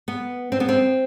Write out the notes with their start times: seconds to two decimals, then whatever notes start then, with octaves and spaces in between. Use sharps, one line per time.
0.08 B3
0.52 C4
0.60 B3
0.69 C4